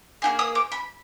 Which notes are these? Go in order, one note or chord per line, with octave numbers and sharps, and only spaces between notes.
A#3 D#4 G#4
D#6
D6
B5